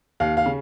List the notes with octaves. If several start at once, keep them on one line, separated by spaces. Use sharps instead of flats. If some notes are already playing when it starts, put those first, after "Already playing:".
D#2 F5
F5
C#3